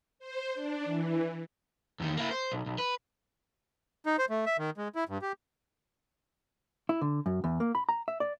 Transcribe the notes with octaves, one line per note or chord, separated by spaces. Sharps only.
C5
D4
E3
E2 D#3
A#3 E4
C5
B1
B1
B4
D#4
C5
A3
E5
D#3
G#3
E4
G2
G4
E4
D3
F#2
E2
A#3
B5
A#5
E5
D5